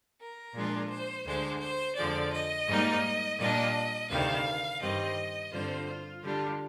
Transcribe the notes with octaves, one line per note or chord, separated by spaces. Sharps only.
A#4
A#2 F3 G#3 D4 F4
C5
D2 D3 G#3 C5
C5
F2 D3 F3 G#3 D5
D#5
G#2 G3 A#3 D#4
A#2 G3 A#3 D4 D#5
D2 C3 D#3 G3 F5
G2 D#3 G3 C4 D#5
G2 D3 G3 C4 F4 C5
F4
D3 G3 D4 F4